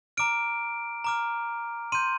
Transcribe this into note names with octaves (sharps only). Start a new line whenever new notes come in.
A#5 D6 F6 D7
A#5 D6 F6
C6 G6 D#7